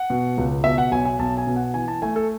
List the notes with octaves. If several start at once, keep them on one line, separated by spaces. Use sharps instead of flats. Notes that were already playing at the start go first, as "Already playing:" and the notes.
Already playing: F#5
B2
C#2
B2 E5
F#5
B1 G#5
G#5
B1 A5
G#5
B2
F#5
E3 G#5
A5
A3 G#5
A4